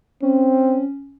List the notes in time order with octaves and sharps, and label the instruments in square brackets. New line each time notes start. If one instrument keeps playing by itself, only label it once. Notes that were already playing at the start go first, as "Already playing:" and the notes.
[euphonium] C4 [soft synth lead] C#4